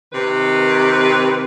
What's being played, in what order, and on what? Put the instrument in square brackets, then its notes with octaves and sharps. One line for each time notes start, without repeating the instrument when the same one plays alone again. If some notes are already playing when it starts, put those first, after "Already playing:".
[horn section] C3 D#3 B4